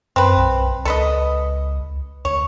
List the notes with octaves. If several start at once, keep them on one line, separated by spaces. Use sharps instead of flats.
F#2 C4 B4
B1
C#2 A4 B4 D#5
D2 C#5